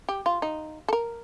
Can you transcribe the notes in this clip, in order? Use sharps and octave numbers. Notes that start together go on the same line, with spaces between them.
G4
F4
D#4
A4
A#4